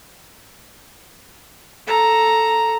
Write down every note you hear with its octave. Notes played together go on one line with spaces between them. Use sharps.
A4 A#5